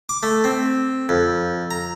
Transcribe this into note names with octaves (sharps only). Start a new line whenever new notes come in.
D6
A3
C4
F2
A#5